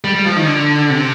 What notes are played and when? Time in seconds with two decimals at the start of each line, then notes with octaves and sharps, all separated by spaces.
0.04 G3
0.15 G3
0.25 F3
0.36 D#3
0.47 D3
0.90 C3